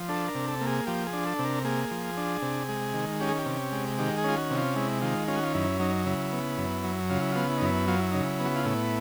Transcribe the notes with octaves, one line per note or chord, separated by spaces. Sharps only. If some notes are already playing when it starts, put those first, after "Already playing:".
Already playing: F3
D4 A4
A#4
C3
A4
A#3
G#4
F3 G4
G#4
D4
A4
C3
A#4
A#3 G#4
F3
D4
C3
G#3
D#3
C#4 G4
G#4
G4
C3
G#3
D#3 G4
G#4
C#4 F4
F#4
C3
F4
G#3 E4
D#3 F4
C#4 F4
F#4
F4
F#2 E4
F#3 D#4
C#3 E4
B3
F#2
F#3
C#3 F4
E4
B3 F4
E4
D#4
F#2 E4
F#3 F4
E4
C#3 D#4
E4
B3
F#4
F4
A2 E4